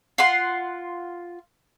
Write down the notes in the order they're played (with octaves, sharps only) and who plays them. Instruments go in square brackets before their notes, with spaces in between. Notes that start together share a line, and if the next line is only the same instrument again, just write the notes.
[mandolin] F4 F#5 C6